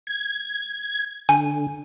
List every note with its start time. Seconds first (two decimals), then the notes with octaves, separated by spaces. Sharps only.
0.07 G#6
1.29 D3 G#5